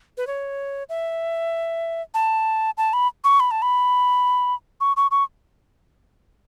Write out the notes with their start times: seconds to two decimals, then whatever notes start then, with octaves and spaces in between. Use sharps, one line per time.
0.17 B4
0.27 C#5
0.89 E5
2.14 A5
2.78 A5
2.93 B5
3.24 C#6
3.40 B5
3.51 A5
3.62 B5
4.81 C#6
4.97 C#6
5.11 C#6